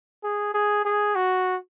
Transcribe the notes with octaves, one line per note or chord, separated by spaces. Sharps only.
G#4
G#4
G#4
F#4